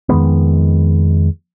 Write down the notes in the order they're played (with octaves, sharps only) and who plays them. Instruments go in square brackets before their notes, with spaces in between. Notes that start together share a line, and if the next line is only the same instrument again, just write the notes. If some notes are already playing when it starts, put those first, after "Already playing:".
[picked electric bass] F2 D#3 G#3 B3